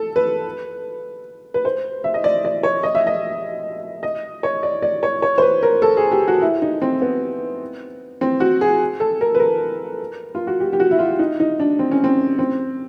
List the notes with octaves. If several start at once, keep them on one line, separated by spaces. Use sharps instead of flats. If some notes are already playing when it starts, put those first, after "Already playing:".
Already playing: A4
B4
B4
C5
E5
D#5
D5
D5
C#5
D#5
E5
D#5
D#5
C#5
D5
D5
C#5
C#5
C5
B4
A#4
A4
G#4
G4
F#4
E4
D#4
C4
B3
C4
F#4
G#4
A4
A#4
B4
A#4
F4
F#4
G4
G4
F#4
E4
F4
D#4
D#4
D4
C4
C#4
C4
C4